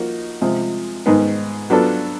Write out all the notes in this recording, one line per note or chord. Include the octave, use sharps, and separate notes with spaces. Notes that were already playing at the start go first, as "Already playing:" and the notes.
Already playing: F3 A#3 D#4 F#4 A#4
C3 F3 G#3
G#2 D#3 G#3 B3
F#3 B3 D4 F4 A4